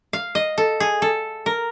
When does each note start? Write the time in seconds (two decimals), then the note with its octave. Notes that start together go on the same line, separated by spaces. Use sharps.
0.13 F5
0.35 D#5
0.58 A4
0.80 G#4
1.02 A4
1.46 A#4